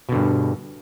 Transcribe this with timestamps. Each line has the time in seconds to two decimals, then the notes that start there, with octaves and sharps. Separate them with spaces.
0.09 B2
0.12 D3
0.15 G2